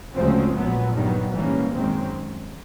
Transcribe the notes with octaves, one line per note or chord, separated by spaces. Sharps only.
D2 C#3 F3 G#3 C4
A#1 A#2 F#3 B3
G2 D#3 F#3 B3
G#2 E3 G3 A#3 C#4
F#2 D#3 G#3 C4